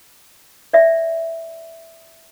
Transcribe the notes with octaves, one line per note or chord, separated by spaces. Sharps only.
D5 E5